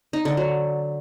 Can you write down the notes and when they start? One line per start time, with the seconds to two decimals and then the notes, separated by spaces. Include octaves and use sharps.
0.13 D#4
0.25 D3
0.37 F#3